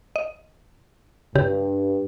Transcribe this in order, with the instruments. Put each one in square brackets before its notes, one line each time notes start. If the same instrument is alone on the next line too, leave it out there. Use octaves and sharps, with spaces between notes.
[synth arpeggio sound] D#5
[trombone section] G2 [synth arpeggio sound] C#3 G4